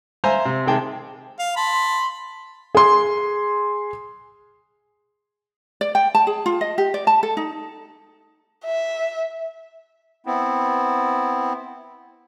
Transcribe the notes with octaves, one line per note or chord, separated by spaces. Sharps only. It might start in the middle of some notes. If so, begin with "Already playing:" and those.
C5 E5 F5 G#5 A#5 C6
C3
C3 D#3 G#3 G#4 G5 A5
F5
A5 B5 C6
G#4 C6
D5
G5
A5
G#4
F4
D#5
G4
D5
A5
A4
D#4
E5
B3 C4 E4